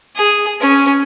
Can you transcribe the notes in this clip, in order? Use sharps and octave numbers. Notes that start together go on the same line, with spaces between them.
G#4
C#4